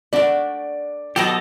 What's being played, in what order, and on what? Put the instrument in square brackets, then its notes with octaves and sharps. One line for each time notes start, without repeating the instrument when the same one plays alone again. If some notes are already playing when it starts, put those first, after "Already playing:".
[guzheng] A3 F#4 [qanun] D4 B5 [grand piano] D5
[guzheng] B2 B3 F#4 [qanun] F#3 [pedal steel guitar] G4 A4 D#5